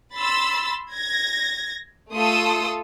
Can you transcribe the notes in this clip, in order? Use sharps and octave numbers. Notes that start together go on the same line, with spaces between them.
B5 C6 E6 A6
G#6 A#6
A3 F4 A4 C6 D#6 E6